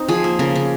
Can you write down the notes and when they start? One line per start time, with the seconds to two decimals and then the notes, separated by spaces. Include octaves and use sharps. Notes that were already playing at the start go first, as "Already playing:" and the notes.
Already playing: C4 D#4
0.08 F3 G#4
0.24 A#3
0.39 C#3 A#4
0.56 C#3